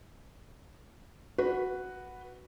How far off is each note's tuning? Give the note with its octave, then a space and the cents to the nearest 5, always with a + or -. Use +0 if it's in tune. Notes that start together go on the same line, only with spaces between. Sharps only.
F#4 +0 B4 +0